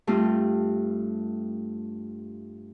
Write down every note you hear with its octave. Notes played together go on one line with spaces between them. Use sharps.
G2 A3 C4 F4